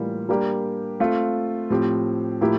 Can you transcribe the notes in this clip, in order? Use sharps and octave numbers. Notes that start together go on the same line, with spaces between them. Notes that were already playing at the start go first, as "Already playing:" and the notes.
Already playing: A2 E3 G3 A#3 F4
G3 A#3 D4 G4
A3 C4 F4
A2 F3 C4 G4
A2 F3 A#3 E4 G4